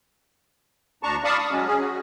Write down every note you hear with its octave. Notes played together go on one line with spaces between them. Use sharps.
D2 D4 A5 A#5 C#6
D5 F5 A5 B5 C#6 D#6
D#6
F#3 G#3 C#4
C#4 G#4
F#4